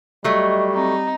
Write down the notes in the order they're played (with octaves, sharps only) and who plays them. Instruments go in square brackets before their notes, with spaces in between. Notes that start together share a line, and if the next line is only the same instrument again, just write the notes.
[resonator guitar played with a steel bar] F#3 A3 [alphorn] G3 [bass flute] D#5
[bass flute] C4 [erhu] D#4